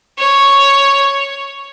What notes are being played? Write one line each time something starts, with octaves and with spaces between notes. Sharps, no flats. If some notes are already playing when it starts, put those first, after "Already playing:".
C#5